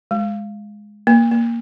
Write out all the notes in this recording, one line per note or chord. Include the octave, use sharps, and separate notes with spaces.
G#3
A#3
A#3